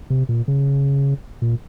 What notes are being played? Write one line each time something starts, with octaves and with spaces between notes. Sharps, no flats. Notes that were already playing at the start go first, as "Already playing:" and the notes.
C3
A#2
C#3
A#2